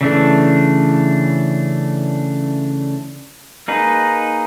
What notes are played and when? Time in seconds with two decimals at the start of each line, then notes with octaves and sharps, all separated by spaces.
0.01 C#3 E3 A3 D4
3.68 A#3 D#4 G#4 B4